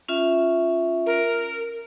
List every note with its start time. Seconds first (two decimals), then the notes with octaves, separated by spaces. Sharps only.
0.08 C#4 F4 E5
1.06 A#4